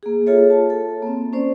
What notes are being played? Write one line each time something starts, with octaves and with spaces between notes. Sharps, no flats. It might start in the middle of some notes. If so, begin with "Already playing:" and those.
A#3 G#4
F4 G#4 A4 C#5 E5
A5
A4
A#3 C4
C#4 C5 D5